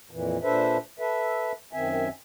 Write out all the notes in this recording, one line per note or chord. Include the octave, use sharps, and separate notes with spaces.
F2 A#2 E3
A#2 D4 A4 B4 C5 E5
A4 B4 E5
F#2 D#3 C4 E5 G#5